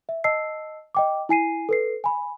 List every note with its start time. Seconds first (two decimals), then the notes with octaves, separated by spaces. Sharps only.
0.09 E5
0.24 D#5 A5 E6 C7
0.95 D#5 G5 D6
1.29 E4 G#5 C7 D#7
1.69 A4 B4 C7
2.04 G#5 B5